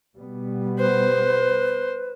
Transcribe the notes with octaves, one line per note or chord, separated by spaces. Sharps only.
B2 G3 B3
B4 C5